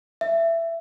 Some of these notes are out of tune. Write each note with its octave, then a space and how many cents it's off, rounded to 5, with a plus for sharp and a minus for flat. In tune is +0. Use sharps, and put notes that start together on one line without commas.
E5 +15